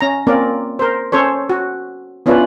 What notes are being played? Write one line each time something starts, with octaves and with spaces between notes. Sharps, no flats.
C#4 A#5
A#3 C4 C#4 A#4 D5
A#4 C5
C#4 A4 C5 C#5
F#4
B3 C#4 D4 E4 F4 B4